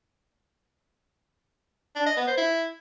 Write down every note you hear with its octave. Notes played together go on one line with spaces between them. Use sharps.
D4
D#5
B3
C5
E4